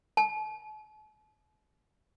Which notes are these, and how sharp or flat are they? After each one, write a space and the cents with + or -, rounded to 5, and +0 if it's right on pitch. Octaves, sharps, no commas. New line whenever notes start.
A5 -45